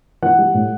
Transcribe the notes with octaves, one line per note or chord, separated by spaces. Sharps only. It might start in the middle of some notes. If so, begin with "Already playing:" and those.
E3 F#5
G3
A2